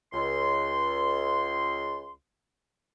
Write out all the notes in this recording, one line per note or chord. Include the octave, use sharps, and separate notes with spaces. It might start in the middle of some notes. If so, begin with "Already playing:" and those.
C#2 C6